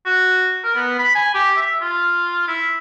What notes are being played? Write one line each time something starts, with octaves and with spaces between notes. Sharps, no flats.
F#4
A#4
B3
B5
G#5
G4
E5
F4
E4